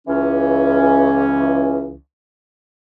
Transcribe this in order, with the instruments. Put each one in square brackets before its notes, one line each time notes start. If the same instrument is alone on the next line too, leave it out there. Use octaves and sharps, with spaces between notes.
[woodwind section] C#2 E3 C#4